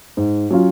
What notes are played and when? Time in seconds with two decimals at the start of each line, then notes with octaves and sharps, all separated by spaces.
0.17 G#2
0.51 F#3 C#4 F4